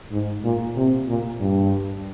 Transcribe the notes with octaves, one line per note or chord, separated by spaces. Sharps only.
G#2
A#2
C3
A#2
G2